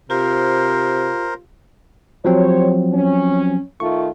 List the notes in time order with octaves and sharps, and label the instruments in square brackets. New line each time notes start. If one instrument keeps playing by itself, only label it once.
[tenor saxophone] C3 [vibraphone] F4 G4 F5 [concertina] A#4 C5
[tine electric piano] F3 F#3 C4 [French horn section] G4 C5 C#5
[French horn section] C#4
[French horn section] D#3 A3 F4 [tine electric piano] C#6